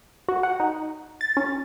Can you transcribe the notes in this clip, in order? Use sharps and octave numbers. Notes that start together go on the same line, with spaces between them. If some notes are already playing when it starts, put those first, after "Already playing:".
F#4
F#5
D#4
A6
C#4